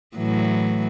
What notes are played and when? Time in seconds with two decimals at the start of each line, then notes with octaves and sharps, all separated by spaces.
0.17 A2 E3 F#3